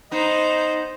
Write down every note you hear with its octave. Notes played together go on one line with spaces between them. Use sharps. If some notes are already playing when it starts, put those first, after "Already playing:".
B3 D#4 C5 D#5